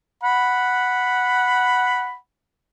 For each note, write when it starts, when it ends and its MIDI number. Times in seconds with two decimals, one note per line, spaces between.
0.23 2.16 78
0.23 2.16 83